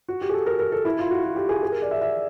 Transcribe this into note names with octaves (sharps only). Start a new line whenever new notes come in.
F#4
G4
G#4
A4
A#4
A#4
A4
E4
F4
F#4
F#4
G4
G#4
G#4
A#4
D5
E5
E5